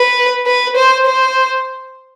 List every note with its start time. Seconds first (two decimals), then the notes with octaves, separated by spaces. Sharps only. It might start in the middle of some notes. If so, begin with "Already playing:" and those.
Already playing: B4
0.47 B4
0.77 C5
1.06 C5